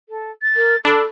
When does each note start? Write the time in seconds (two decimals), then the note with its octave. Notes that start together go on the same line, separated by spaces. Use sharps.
0.09 A4
0.42 A6
0.56 A#4
0.85 D4 A4 B5